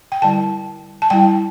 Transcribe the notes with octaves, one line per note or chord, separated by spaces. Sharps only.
G5
D3 G3 E4 A5
A5
G3 E4 G5